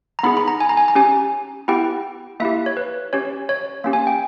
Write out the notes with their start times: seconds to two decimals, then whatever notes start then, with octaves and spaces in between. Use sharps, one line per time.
0.19 A#5
0.23 B3 D#4 G#4 B5
0.37 B5
0.48 A#5
0.60 G#5
0.69 A#5
0.77 G#5
0.88 A#5
0.95 C#4 G4 G#5
1.68 B3 E4 G4 G5
2.40 A#3 E4 G4 E5
2.66 C#5
2.77 B4
3.13 C#4 G4 C#5
3.49 C#5
3.84 A#3 C#4 G4
3.93 G#5
4.07 G5